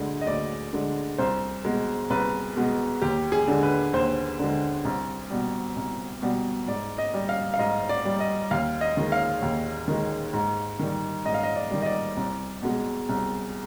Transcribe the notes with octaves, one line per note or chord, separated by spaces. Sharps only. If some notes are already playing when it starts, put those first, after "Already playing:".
Already playing: D2 D3 G#3
D#5
D2 D5
D3 G#3
C2 C5
B2 G#3
C2 B4
B2 G#3
D#2 G4
G#4
D3 G#3
B4
D#2 C5
D3 G#3
C2
B2 G3
C2
B2 G3
G#2 D5
D#5
G3
F5
F5
G#2 D#5
D5
G3
D#5
D#2 F5
D#5
D#3 G#3
F5
D#2
D#3 G#3
G#2
D#3 G3
G#2 D#5
F5
D#5
D5
D#3 G3
D#5
D5
C2
B2 G#3
C2